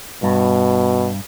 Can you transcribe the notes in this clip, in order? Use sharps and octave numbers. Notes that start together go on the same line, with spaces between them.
G2 B2